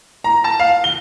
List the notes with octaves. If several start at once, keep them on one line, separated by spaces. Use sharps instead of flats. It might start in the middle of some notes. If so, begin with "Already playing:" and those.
A#5
A5
F5
G7